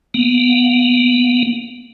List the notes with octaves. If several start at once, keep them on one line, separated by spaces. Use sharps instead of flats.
A#3 B3